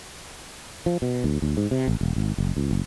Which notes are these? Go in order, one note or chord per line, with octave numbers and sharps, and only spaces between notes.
F3
B2
D2
D2
G#2
C3
A1
E1
G#1
F#1
C#2
F#1